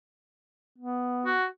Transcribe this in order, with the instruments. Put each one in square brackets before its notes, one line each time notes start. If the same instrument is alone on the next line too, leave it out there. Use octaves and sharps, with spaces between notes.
[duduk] B3
[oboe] F#4